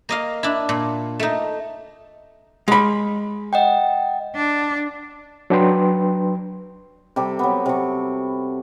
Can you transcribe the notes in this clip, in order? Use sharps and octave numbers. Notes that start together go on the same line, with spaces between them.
A#3 D#5 F5
D4 E4
A#2
A3 D#4
G#3 B5
D#5 F#5 G5
D4
F#3 D4 B4 G5 C6
C3 G3 G4 A4
F#3 B3
C3 C#6